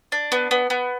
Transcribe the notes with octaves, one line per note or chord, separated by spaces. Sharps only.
D4
B3
B3
B3